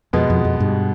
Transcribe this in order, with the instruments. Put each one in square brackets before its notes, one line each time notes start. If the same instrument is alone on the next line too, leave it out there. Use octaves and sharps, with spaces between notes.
[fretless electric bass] F2 [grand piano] B2 G#3 B3
[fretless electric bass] F2
F2
G2